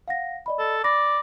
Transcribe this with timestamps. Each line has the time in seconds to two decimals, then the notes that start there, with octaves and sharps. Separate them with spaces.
0.08 F5 F#5 A#6
0.46 D5 D#5 B5
0.59 A4
0.84 D5 B5 A#6